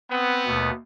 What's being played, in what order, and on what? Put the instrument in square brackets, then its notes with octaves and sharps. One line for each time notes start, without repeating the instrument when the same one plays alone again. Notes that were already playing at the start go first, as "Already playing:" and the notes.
[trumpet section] B3 [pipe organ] C4
[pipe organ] D#2 B2 A3